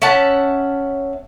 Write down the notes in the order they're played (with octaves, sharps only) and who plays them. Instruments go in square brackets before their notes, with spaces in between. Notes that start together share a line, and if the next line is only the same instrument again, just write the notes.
[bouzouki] C#4 E5 F#5 A5